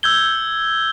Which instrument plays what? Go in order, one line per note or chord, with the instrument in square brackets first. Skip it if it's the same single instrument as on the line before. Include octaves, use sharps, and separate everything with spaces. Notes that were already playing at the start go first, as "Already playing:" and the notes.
[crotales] E6 G6 G#6 G7